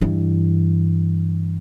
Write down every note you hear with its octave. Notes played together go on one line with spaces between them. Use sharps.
G2 E3